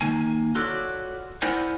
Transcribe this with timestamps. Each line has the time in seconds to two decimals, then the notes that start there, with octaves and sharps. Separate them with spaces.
0.01 D#3 A#3 G#5
0.55 F4 F#4 A4 B4 C#5 D5
1.42 E4 A#4 C5 D5 F#5 G#5